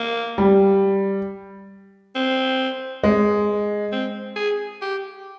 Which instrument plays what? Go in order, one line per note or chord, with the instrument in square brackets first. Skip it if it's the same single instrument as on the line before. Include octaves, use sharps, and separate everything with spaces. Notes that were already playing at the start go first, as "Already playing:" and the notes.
Already playing: [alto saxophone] A#3
[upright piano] G3
[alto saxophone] C4
[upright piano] G#3
[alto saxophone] C4
G#4
G4